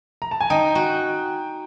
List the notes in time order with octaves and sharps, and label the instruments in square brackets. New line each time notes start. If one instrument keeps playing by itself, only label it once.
[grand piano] A#5
A5
G#5
[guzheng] D#4 [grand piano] G5
[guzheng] F#4